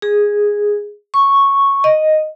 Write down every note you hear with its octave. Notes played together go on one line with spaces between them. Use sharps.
G#4
C#6
D#5